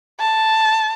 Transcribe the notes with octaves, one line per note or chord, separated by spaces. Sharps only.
A5